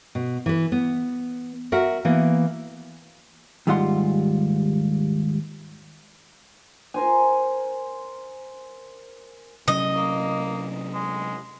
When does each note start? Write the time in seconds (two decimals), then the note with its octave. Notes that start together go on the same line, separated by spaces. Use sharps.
0.15 B2
0.46 E3 B4
0.72 B3
1.72 F#4 A#4 E5 F#5
2.05 E3 A#3 B3
3.67 D#2 G#2 G3 F4 F#5 C6
6.94 A#4 C5 G#5
9.68 C3 F#3 C#4 D#5
9.96 A#3
10.94 G#3